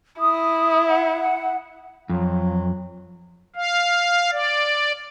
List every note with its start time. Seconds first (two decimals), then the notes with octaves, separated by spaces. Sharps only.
0.20 E4 D#6
0.87 F#5
2.09 F2 F#3
3.56 F5
4.31 D5